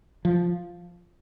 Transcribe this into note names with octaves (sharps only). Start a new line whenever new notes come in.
F3